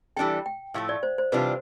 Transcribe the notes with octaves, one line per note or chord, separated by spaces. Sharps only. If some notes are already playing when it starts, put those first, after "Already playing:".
E3 G3 D4 A4 G5
G5
A2 F3 A3 F5
D5
C5
C5
C3 E3 G3 D4 F4 B4